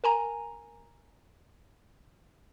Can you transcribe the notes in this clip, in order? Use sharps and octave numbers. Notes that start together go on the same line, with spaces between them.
A#4 G#5 A#5